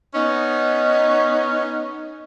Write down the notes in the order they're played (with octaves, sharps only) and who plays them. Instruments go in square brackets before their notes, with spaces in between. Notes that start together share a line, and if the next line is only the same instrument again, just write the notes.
[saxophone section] B3 C#4 D#4